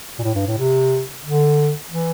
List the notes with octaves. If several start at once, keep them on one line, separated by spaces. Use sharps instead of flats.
A#2
A2
G2
A2
C3
D3
E3